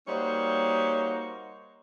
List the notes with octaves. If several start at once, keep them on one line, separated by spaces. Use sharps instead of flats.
G3 A#3 D#4 F#4 C5 C#5